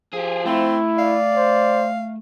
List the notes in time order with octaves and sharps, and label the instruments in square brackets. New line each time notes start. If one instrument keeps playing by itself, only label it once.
[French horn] F3 [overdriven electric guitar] G4 G#4
[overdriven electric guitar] A3 [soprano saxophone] C4 [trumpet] E4
[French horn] D5 [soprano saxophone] F5
[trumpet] C5